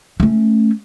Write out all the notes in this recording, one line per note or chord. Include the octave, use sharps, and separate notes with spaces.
A3 C#4